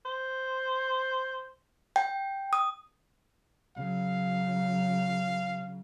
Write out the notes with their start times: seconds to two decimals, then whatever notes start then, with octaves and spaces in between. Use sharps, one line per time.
0.06 C5
1.96 G5
2.53 D#6
3.76 C#3 F#3 F5